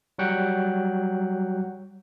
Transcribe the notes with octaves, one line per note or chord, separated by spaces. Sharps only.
F#3 G3 F#4 F#5 G5 F#6